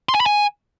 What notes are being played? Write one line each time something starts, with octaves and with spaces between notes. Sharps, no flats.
C6
G#5
B5
G#5